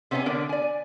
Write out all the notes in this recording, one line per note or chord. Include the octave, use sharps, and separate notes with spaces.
C3 B3 C#4 D#4 G#4 G#5
D3 B3 D4 A#4
D5 G#5